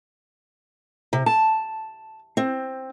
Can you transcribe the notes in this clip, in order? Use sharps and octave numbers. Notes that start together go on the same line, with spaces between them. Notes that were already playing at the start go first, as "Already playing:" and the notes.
C3
A5
C4